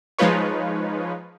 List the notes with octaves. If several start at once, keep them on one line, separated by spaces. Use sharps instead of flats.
F3 G#3 D#4 F4 B4 C#5